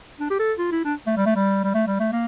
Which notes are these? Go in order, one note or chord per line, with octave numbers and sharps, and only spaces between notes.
D4
G4
A4
F4
E4
D4
A3
G3
A3
G3
G3
A3
G3
A3
A#3